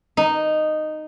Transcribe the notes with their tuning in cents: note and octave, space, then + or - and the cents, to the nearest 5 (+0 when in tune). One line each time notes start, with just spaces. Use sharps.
D#4 -10